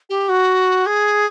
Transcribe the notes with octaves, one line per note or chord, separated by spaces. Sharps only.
G4
F#4
G#4